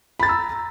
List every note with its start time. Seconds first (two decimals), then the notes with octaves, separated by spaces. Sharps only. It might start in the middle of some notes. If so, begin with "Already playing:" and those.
0.20 B5
0.23 A6
0.26 A#5
0.29 E6